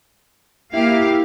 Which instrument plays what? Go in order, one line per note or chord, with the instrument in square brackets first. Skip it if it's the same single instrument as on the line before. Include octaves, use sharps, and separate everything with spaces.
[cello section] A#3 G4 F5 [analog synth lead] E4